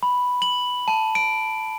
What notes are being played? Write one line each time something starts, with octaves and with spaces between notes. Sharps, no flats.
B5
F#7
A5
D7